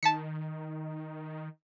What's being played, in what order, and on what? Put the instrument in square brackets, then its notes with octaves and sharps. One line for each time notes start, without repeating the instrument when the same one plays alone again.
[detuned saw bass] D#3 [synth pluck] A5 B6 C#7